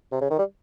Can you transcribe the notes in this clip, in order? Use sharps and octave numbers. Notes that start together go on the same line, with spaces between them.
C3
C#3
D#3
G3